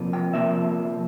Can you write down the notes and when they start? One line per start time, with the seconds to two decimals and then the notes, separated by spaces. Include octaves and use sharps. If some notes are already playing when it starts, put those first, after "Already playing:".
Already playing: C3 F3 A#3
0.13 G5
0.34 C3 F3 A#3 E5